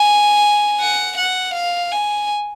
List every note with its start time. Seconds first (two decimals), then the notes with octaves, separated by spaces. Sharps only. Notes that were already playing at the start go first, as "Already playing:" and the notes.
Already playing: G#5
0.80 F#5
1.17 F#5
1.54 F5
1.92 G#5